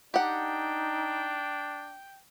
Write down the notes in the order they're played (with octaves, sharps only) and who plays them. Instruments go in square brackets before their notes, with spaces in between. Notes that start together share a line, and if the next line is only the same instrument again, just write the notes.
[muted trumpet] D4 [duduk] D#4 [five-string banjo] G4 F#5 [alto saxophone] G5